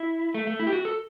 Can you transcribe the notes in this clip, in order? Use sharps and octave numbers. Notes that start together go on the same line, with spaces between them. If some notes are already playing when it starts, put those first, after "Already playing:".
Already playing: E4
A3
A3
E4
G4
F#4
A4